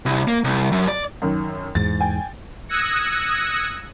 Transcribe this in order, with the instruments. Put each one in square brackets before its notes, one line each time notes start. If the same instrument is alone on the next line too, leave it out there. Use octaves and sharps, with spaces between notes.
[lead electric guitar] C2
A#3
C2
F#2
D5
[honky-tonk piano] F#2 D#3
[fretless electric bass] E2 G#2 [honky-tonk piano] A6
[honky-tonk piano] G5 G#5
[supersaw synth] D#6 E6 F#6 G#6 A#6 C#7